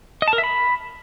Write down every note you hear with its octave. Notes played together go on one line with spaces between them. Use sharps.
D#5
A5
A#4
E5
B5